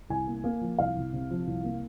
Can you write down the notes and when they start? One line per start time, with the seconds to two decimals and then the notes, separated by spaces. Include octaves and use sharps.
0.10 C2 G#5
0.27 A#3
0.44 A#3
0.61 F3
0.79 C2 F5
0.96 C2
1.13 C3
1.30 F3
1.47 C2
1.64 A#3